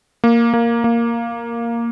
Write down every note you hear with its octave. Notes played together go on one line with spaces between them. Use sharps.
A#3
A#3
A#3